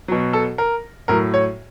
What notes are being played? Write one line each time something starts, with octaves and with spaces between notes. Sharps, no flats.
B2 F#3
A4
A#4
A2 F#3 A#4
C#5